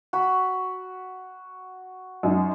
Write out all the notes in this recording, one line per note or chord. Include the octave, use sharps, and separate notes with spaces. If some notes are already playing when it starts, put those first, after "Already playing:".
F#4 B5
F#2 D#4